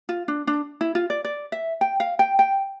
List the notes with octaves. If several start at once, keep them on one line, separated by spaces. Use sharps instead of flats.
F4
D4
D4
E4
F4
D5
D5
E5
G5
F5
G5
G5